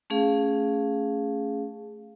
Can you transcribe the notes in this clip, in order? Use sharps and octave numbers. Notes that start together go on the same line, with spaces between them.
A3 C#4 G#4 F5